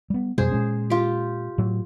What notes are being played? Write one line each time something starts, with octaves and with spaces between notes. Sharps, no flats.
G3 B3
F2 B2 G3 G#4 C5
A#2 G#3 C#4
F4 G4
A2 F#3